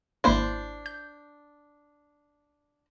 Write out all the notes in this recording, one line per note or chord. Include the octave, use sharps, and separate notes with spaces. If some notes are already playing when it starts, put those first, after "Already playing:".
G#1 A#3 D4 E4 C5
G6